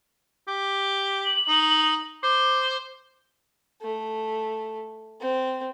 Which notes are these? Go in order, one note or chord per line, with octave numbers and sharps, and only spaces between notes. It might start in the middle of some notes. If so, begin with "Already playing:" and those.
G4
F#7
D#4
C5 D6
A3
C4